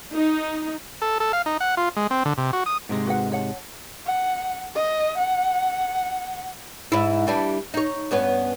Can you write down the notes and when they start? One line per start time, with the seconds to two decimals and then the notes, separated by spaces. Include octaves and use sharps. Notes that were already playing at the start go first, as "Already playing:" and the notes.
0.15 D#4
1.02 A4
1.20 A4
1.33 F5
1.46 D#4
1.60 F#5
1.77 F4
1.97 G#3
2.10 C4
2.25 D3
2.38 C3
2.53 F#4
2.66 D#6
2.89 G#2 C3 G#3
3.06 F#4 B4 F#5
3.32 C#5 F#5 A5
4.06 F#5
4.75 D#5
5.18 F#5
6.92 G#2 E4
7.27 E3 G3 D4
7.74 D#4 C#5
8.11 G2 B3 C#4